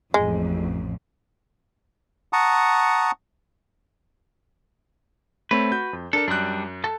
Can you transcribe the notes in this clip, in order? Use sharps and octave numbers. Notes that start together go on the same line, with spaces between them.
A1 F2 G#3
F#5 A5 A#5 C#6 D#6
A3 C4 B4 C#5
F#4 G6
F2
D4 A4 A#4 A5
F#2 G3 D4 F#6
A4 A5